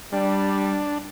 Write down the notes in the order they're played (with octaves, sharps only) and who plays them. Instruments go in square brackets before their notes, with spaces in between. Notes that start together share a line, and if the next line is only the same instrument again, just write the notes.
[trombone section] G3 [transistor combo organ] D4